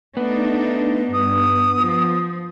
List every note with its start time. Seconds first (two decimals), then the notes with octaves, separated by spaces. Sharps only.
0.17 A3 B3 D4 D#4
1.13 G2 D#6
1.77 F3